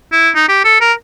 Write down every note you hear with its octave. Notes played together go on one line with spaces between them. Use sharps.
E4
D#4
G4
A4
A#4